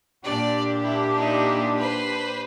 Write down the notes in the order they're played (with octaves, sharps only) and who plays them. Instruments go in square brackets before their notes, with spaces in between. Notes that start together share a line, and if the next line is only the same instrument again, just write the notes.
[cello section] A#2 D4 G4 [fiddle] D5
[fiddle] E4
D#4 E4
B4 C5